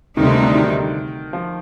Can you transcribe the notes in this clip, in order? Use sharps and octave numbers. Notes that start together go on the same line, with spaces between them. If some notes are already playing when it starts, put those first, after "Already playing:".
D2 C3 D#3 G3 C4 D#4
D3
D3
D#3
F3